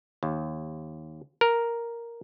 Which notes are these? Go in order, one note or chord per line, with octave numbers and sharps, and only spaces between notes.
D#2
A#4